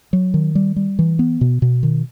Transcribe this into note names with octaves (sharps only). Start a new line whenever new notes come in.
F#3
D#3
G3
G3
E3
B3
B2
B2
D#3